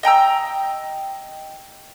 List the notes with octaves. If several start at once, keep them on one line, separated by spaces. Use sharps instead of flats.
D#5 G5 A#5 E6